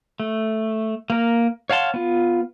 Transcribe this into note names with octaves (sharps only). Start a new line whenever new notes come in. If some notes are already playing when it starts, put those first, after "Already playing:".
A3
A#3 A#4
C#5 F5 F#5 A5 C6
B3 F4